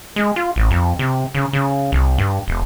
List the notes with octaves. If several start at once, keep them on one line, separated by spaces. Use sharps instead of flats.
G#3
F4
A1
F2
C3
C#3
C#3
C2
G2
E1